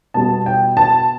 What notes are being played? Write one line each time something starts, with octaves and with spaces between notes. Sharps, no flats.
B2 G3 B3 A5
G5
A5